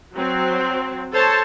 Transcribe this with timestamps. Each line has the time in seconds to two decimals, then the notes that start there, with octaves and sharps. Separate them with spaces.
0.14 F#3 C4
1.13 A4 C5 C#5 A5